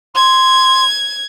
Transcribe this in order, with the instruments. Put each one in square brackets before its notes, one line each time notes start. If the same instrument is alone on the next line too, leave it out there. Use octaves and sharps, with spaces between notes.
[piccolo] C6 [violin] G#6